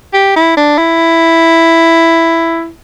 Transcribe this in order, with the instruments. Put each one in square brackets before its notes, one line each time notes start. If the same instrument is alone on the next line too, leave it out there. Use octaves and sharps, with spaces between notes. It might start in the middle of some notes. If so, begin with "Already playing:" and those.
[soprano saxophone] G4
E4
D4
E4